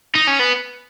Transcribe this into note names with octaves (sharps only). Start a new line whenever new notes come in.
D#4
C#4
B3